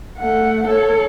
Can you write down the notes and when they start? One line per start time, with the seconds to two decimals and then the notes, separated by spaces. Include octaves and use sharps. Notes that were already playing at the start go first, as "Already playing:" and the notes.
0.18 A3 F#5
0.68 A4 C#5